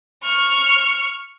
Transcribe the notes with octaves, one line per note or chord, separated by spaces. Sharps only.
C#6 F6